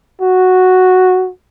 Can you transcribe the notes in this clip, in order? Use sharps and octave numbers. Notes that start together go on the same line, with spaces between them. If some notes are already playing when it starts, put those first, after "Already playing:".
F#4